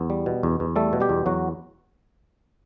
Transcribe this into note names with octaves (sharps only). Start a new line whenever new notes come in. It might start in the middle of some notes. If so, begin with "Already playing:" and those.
Already playing: E2 B3
G3
B2
E2
E2
G3 A3 A4
B2
G3 G4
E2
E2 F#3 F#4